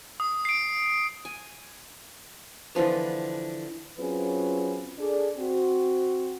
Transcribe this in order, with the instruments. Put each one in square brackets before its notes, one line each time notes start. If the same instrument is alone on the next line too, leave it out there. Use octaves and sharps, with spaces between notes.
[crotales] D#6
C7 D7
[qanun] G#5
D3 E3 F3 B3
[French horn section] F#3 C4 C#4 F4 G#4 B4
D4 G#4 A4 D5
C4 F#4